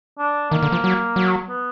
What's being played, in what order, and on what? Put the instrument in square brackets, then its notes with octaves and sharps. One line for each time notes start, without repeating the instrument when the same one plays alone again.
[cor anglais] D4
[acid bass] D#3 [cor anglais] A#3
[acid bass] D3
F3
F#3
F#3
[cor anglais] B3